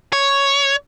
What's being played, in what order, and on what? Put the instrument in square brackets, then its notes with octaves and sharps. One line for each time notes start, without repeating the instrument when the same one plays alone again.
[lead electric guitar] C#5